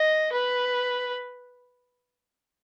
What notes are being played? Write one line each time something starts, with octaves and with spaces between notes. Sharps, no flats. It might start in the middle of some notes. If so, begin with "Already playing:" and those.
Already playing: D#5
B4